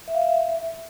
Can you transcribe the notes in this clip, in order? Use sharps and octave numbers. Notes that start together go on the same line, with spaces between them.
E5
F5
E5